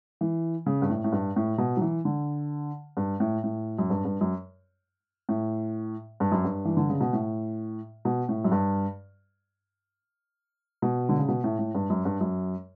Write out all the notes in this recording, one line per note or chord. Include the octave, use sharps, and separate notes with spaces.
E3
C#3
G2
A2
A2
G2
A2
B2
F#3
E3
D3
G2
A2
A2
F#2
G2
G2
F#2
A2
G2
F#2
G2
E3
D3
C#3
B2
A2
B2
A2
F#2
G2
B2
D3
C#3
B2
A2
A2
G2
F#2
G2
F#2